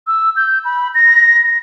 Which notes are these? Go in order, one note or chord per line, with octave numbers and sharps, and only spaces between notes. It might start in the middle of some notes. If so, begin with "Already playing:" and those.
E6
G6
B5
A#6